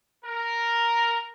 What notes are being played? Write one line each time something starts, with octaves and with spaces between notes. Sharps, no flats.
A#4